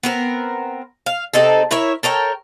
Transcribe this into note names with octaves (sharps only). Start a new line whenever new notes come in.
B3 C4 A#4
F5
C3 C4 D#4 A4
E4 A#4 C#5 E5
A4 A#4 C#5 G5